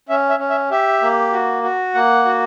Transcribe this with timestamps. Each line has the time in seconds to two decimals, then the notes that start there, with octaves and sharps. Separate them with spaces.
0.09 C#4 E5
0.29 E5
0.39 C#4
0.50 E5
0.71 G4 E5
1.02 A#3
1.32 F#4
1.63 F#4
1.94 A#3 F#5
2.25 F#4